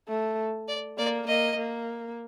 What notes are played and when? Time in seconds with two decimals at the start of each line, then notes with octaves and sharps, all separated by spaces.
0.08 A3
0.68 D5
0.98 A#3 D5
1.27 A#3 D#5
1.57 A#3